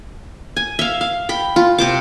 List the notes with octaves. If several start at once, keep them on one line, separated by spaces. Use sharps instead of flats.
G#5
E5 F5
F5
G5 B5
F4
C3 C5 D6